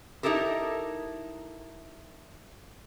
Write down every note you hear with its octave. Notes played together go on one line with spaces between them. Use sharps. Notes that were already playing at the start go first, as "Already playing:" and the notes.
D#4 E4 G4 A4 A#4